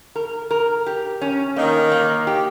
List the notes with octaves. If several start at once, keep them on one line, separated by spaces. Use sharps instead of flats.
A#4
A#4
G4
C#4
D#3 A#3
A#3
G4